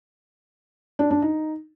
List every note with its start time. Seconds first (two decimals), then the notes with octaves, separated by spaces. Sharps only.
0.99 D4
1.11 D4
1.22 D#4